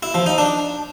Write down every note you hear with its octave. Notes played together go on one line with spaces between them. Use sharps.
E4
F3
D#4
D4